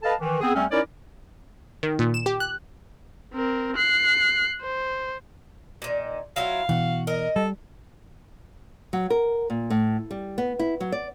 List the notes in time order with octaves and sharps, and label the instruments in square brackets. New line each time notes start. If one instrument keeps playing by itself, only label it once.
[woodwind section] A4 B4 D#5 F5 A5
D#3 E3
B3 C4 G#4
E2 G3 A3 C4 C#4
C#4 D#4 E4 A#4 C#5 D5
[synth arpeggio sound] D#3
A#2
E7
G4
F#6
[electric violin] C4 A#4
F#6 C7
C5
[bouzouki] A#2 D#3
[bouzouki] F#3 E4 F4 [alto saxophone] F5
[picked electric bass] B2 E3 [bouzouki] F#4
[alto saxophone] A#4 [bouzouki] D#5
[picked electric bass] G3 [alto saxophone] A4
[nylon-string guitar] F#3
A#4
A#2
A2
G3
B3
E4
F#3
D5